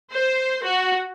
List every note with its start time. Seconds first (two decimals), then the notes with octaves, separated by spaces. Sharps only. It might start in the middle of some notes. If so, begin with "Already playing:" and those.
0.12 C5
0.63 F#4